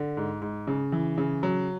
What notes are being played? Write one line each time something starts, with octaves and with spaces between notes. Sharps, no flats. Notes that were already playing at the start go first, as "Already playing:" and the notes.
Already playing: D3
G#2
G#2
C#3
E3
C#3
F#3